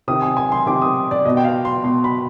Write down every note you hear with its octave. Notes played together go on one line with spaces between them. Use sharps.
C3 D#3 D#6
G#5
G#5
C6
C3 D#3 D6
D#6
D5
B2 D#5
G5
F5
C6
B2 C6
B5